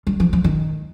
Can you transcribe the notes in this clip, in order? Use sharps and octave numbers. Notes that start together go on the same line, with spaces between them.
G3
F3
F3
D#3